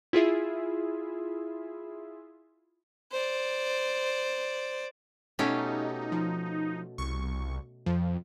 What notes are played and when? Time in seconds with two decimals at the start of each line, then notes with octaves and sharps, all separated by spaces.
0.13 E4 F4 G#4 E5
3.12 C5 D5
5.39 B2 A3 C#4 D#4 G4
6.12 F3
6.98 C2 C#6
7.86 F2 F3